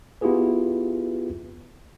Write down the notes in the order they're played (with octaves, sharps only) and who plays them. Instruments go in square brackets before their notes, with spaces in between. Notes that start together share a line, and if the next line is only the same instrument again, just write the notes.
[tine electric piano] B3 E4 F4 G4 G#4 B4